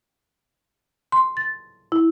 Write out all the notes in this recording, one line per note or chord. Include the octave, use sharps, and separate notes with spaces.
C6
A6
E4